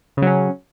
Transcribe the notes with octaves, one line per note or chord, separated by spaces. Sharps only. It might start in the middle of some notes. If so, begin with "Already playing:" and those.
C#3 F#3 C#4